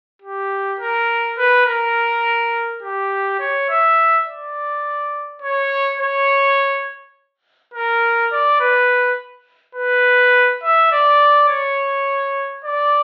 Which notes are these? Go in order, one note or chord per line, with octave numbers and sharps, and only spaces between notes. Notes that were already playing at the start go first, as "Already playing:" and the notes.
G4
A#4
B4
A#4
G4
C#5
E5
D5
C#5
C#5
A#4
D5
B4
B4
E5
D5
C#5
D5